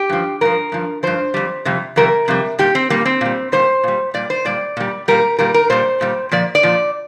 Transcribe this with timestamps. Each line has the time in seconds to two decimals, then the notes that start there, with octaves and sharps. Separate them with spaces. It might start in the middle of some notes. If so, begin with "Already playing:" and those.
Already playing: G4
0.09 G2 F3
0.41 G2 F3 A#4
0.72 G2 F3
1.03 G2 F3 C5
1.34 F2 C3 G3
1.65 F2 C3 G3
1.96 F2 C3 G3 A#4
2.28 F2 C3 G3
2.59 A#2 G3 G4
2.75 C4
2.90 A#2 G3 A#3
3.06 C4
3.21 A#2 G3
3.52 A#2 G3 C5
3.83 A#2 G3
4.14 A#2 G3 D5
4.30 C5
4.45 A#2 G3 D5
4.77 A#2 G3
5.08 A#2 G3 A#4
5.39 A#2 G3 A#4
5.54 A#4
5.70 A#2 G3 C5
6.01 A#2 G3
6.31 A#2 F3 D5
6.55 D5
6.63 A#2 F3